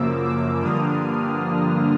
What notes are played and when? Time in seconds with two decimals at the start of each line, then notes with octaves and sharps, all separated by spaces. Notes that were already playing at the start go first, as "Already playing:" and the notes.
Already playing: F#2 C#3 F3 A#3 D6 E6
0.23 D6 E6
0.61 G2 D3 F3 A#3 D4 D#6 F6